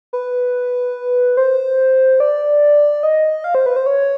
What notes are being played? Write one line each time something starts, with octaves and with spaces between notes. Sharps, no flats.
B4
C5
D5
D#5
F5
C5
B4
C5
C#5